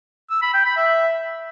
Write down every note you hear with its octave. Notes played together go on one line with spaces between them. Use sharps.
E6
B5
G5
B5
E5